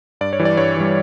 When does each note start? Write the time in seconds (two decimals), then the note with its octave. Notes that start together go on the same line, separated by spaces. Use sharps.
0.21 G2 D5
0.33 C#5
0.40 E3 G3
0.45 D5
0.57 G2 C#5
0.77 E3 G3